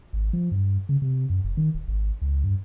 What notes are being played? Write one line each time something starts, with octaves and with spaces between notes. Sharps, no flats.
G#1
F3
G2
C#3
C3
F#2
F1
D#3
D1
G#1
C#2
G2